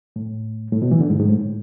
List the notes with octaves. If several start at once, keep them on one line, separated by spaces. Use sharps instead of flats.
A2
A2
B2
E3
D3
G#2
G#2
A2